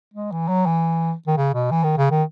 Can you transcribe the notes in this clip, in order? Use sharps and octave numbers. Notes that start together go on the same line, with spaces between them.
G#3
E3
F#3
E3
D#3
C#3
B2
E3
D#3
C#3
D#3